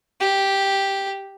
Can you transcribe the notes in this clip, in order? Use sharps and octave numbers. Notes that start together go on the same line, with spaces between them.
G4